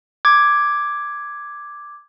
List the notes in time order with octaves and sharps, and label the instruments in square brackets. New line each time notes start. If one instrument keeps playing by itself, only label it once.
[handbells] D6 G#6